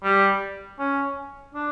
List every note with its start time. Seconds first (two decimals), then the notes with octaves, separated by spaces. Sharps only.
0.04 G3
0.79 C#4
1.55 D4